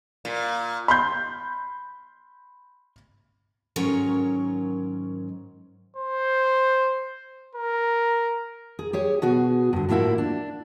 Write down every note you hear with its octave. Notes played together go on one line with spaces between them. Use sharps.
A#2
B5 C6 G6
G#2 D#3 F#3 C#4 A#4 C#5
C5
A#4
G#4
G4 G#4 C#5
B2 F#4 G#4
G2 D3
A2 F3 A#3 E4 F#4
D4